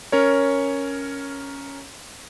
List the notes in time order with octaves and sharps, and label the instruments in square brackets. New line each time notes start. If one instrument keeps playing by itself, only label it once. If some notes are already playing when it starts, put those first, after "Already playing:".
[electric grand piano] C#4 A#4 C#5